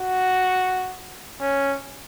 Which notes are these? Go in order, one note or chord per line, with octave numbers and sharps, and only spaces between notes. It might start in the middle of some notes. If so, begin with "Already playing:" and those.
Already playing: F#4
C#4